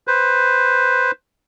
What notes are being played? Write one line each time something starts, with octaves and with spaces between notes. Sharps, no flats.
B4 C5